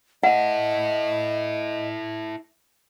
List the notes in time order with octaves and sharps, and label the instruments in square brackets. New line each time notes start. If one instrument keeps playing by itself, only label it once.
[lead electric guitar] E4 A4 [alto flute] D#5 [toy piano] F#5